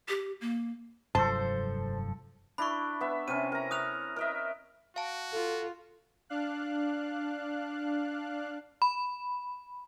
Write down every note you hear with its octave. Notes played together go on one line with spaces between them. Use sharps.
G4
A#3
F1 G2 F3 F#3 A4 C5 A5
D4 E4 B5 C#6
B3 E5
C3 C#4 D#7
A#4 A#5
C#6 D#6 F#6 F7
A#4 D#5 E5
F#4 F5 A5
F4 A4
D4 F5 F#6
B5